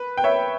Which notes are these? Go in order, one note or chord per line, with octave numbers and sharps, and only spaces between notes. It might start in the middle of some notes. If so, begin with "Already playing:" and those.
Already playing: B4
G5
C#5 E5